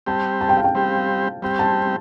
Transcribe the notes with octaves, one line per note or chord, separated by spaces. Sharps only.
G3 C4 G4 A5
A5
G5
F5
G5
G3 C4 G4
G3 C4 G4
A5